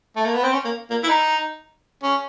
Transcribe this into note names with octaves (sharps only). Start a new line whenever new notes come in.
A3
A#3
B3
C4
C#4
A#3
A#3
E4
D#4
C#4